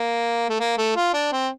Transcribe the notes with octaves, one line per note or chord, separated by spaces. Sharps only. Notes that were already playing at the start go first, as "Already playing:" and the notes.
Already playing: A#3
A3
A#3
A3
F4
D4
C4